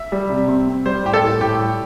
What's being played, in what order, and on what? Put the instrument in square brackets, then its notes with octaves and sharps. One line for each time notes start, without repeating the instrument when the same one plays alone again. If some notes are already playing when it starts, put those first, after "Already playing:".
Already playing: [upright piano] E5
[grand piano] G3
C3
C4
C4
[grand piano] G3 [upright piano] C5
[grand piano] A2 [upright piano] G4
[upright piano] A4
[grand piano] A2
[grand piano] A2 [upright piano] G4
[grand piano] G3